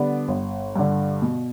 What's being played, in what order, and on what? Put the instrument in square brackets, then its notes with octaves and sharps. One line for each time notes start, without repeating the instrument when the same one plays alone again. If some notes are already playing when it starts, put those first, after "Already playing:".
Already playing: [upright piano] D3 G3 B3 D4
G1
G2 D3
B2